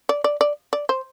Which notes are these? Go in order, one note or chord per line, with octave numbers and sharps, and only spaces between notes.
D5
D5
D5
D5
C5